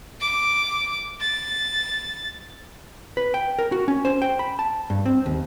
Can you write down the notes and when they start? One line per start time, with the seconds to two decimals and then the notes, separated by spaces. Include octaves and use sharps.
0.21 D6
1.21 A6
3.17 B4
3.34 G5
3.59 A#4
3.72 F#4
3.88 C#4
4.05 C5
4.22 G5
4.39 B5
4.59 A5
4.90 G2
5.06 C4
5.26 D#2